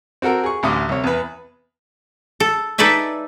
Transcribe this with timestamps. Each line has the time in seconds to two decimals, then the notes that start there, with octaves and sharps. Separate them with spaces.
0.22 C4 F#4 A4 A#4
0.43 G#4 C#6
0.63 A1 D2 D6 D#6
0.89 C2 C#5
1.04 E2 B4
2.40 A4
2.78 D#4 A4 B4 D5 E5 G#5